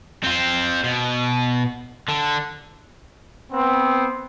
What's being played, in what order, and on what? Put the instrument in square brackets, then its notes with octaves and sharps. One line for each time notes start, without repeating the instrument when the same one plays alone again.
[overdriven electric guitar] C4 F4
B2
D3
[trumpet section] B3 C4